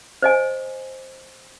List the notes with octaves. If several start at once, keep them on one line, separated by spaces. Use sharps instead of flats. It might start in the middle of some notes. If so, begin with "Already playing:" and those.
C5 D#5 G#5